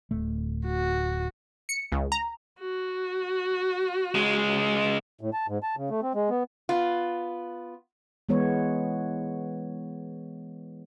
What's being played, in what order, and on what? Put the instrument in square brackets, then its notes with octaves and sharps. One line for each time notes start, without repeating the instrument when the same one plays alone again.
[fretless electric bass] D1 A3
[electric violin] F#4
[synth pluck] C#7
C#2
A#5
[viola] F#4
[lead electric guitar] C#2 G#3
[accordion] A2
A5
G#2
A5
C#3
A3
C4
G#3
B3
[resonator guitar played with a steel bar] B3 F4
[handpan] E3 G#3 B3 C#5